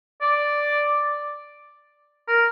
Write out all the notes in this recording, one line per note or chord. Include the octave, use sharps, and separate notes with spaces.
D5
A#4